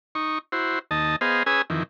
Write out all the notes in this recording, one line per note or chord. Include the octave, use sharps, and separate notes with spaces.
D#4 C#6
E4 F#4 C5
D#2 D#5 A5
B3 G#4 C5 D#5 F5
C#4 G#4 B4 G#5 D#6 E6
F2 D#3 E3